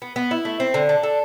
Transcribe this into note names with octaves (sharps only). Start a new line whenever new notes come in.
B3
B3
E4
A3
C4
D3
D4
A4